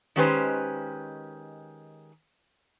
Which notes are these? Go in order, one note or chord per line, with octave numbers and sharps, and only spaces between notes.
D#3 G#3 C#4 G4 B4 C5